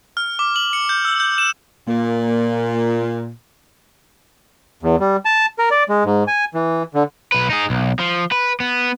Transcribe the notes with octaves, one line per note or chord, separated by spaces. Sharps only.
F6
D6
F#7
C#7
G6
E6
G6
E7
A#2 A#3
E2
G3
A5
A#4
D5
G#3
G#2
G#5
E3
D3
B1 B4
D#4 G#4
B1
F3
B4
B3